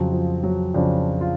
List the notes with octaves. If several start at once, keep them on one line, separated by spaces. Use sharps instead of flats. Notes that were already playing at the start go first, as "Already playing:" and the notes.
Already playing: F2 C#3 F3 F#3
F3
F#3
F2 C#3 F3 D4
F4